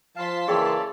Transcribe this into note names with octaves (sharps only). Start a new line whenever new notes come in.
F3 F5 A5 C6 B6
C#3 E3 A#3 G#4 A4 C#5 D5 G5